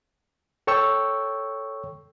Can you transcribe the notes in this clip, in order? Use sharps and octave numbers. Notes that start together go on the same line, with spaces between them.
A4 C#5 G5 C#6 E6